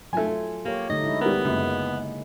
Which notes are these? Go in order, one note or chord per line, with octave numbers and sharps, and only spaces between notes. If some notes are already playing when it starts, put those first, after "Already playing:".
F#3 A3 F4 G#5
A#3 G4 C#5
D3 A3 D#4 D#5
G#3 E4
G3 B3 A#4
F#2 C#3 G#3 A#3